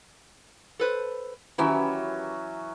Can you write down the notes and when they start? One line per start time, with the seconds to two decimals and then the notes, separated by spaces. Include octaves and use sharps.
0.79 A4 B4 C5
1.58 D#3 E3 F#3 C#4 E4 G4